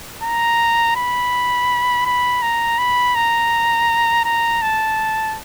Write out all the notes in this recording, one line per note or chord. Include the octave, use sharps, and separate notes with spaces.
A#5
B5
B5
A#5
B5
A#5
A#5
A5